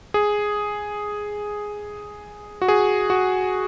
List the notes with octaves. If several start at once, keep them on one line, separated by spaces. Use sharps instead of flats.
G#4
F#4
G#4
F#4